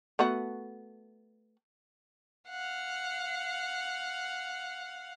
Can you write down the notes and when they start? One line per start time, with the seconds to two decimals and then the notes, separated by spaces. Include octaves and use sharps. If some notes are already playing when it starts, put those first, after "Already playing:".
0.19 A3 B3 F#4
2.49 F5 F#5